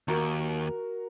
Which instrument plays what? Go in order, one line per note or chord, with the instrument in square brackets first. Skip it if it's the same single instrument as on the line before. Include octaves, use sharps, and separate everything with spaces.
[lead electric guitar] D#2 [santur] F#4 A#4 C#6